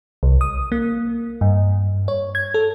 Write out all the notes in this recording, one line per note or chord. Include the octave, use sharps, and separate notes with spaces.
C2
D#6
A#3
G2
C#5
G#6
A4